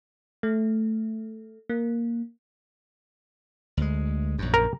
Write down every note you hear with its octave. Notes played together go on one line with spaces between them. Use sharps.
A3
A#3
D2 G#3
A#1 F#2
A#4